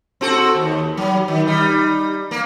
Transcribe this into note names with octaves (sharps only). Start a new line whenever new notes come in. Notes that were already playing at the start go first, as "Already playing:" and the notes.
C4 F#4 A4
D#2
F#3
D#3
G3 D#4
A#3